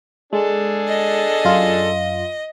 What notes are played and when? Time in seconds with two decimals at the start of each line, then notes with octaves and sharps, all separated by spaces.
0.33 G#3 D4 G#4 A4
0.88 D#5
1.45 F#2 F4